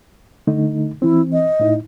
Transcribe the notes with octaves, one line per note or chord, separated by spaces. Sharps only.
D3 A3 D#4
E3 C4 E4
D#5
A2 D#4 E4